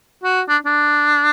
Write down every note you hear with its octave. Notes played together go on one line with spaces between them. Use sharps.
F#4
D4
D4